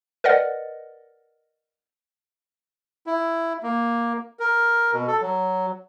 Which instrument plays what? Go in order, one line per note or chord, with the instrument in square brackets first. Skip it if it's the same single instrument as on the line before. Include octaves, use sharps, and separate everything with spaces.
[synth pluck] A#4 B4 D5 D#5 F#5
[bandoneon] E4
A#3
A#4
B2
A4
F#3